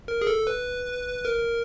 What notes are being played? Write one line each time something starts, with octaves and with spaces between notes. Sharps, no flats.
A#4
G#4
A4
B4
A#4